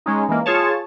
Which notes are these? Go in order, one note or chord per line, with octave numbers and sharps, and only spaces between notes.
G#3 C#4 D#4
E3 G#3 A#3
F4 G#4 C#5 A5